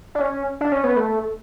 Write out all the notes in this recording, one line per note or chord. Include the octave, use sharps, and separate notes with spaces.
D4
C#4
D4
C#4
B3
A3